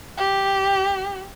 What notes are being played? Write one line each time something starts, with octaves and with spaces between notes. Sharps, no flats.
G4